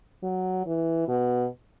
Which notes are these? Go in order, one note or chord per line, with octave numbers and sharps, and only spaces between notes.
F#3
E3
B2